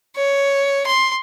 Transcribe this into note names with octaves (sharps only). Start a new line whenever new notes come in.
C#5
C6